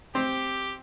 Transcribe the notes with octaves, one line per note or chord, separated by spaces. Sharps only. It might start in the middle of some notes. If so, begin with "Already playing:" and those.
C4 G4